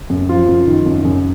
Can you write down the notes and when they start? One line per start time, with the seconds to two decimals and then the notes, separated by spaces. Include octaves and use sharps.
0.10 F#2
0.29 F3 F4
0.48 F#2
0.67 D#3
0.86 F#2
1.05 F#2